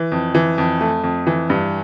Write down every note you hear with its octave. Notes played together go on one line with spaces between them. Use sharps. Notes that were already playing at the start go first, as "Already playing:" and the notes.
Already playing: E3
F2
E3
F2
A3
F2
E3
G2